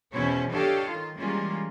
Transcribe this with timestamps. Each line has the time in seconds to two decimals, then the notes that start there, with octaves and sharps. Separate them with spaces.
0.13 E2 B2 C#4 E4 C5 C#5
0.50 D4 G4 A4 C#5 D#5 F5
0.88 D#3 F4
1.18 E3 G3 G#3 A#3 C#4 F4